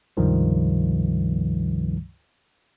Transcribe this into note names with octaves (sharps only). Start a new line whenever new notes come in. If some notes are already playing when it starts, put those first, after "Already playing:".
C#2 G2 C3 D#3 F3 G3